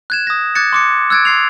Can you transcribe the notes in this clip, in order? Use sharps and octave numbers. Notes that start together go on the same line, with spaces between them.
F#6 G#6 E7
D#6 A#6
D6 F#6 G#6 A6 C#7
C6 D6 C#7
E6 F#6 G#6 A6 D7
C6 G#6 C7 F7